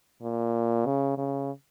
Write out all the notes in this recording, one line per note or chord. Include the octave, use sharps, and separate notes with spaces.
A#2
C#3
C#3